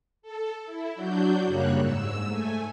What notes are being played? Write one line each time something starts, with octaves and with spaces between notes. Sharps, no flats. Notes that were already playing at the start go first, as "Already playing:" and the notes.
A4
E4
F#3 D4 F#4 G6
F#2 C#3 G3 A#3 C#5 F#6
G#2 E6
A3 G#5